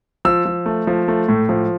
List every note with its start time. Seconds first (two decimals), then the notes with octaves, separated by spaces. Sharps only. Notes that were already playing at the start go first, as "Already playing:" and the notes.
0.25 F3 E6
0.46 F3
0.66 A3
0.87 F3
1.08 A3
1.29 A2
1.49 F3